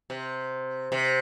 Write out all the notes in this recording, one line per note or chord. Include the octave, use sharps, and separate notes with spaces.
C3
C3